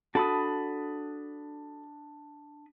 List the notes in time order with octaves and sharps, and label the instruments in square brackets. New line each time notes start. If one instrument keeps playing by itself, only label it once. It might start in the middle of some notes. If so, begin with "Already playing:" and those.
[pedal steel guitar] D4 B5 D#6 [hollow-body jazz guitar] F#4 A4